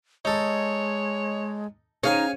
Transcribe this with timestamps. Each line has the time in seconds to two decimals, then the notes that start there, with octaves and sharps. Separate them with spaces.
0.25 G#3 D#4 A4 C#5
2.04 C#4 D#4 G#4 F5 G#5